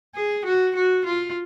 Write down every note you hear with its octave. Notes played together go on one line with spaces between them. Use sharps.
G#4
F#4
F#4
F4